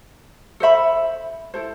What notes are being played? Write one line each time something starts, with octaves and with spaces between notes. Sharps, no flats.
A4 C5 E5 B5
E4 A4 C5